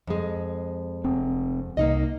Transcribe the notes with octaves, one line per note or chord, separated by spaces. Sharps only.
F2 G#3
F1 C4
C2 A#3 D#4 D#5